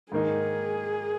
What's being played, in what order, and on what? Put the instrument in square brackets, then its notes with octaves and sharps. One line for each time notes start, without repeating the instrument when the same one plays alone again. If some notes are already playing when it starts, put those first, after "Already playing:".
[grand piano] G#2 D#3 A#3 D#4 [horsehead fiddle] G#4